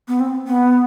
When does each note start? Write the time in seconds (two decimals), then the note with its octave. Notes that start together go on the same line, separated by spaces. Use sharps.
0.08 B3
0.20 C4
0.47 B3